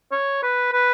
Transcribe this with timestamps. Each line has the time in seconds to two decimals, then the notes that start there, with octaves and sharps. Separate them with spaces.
0.12 C#5
0.43 B4
0.73 B4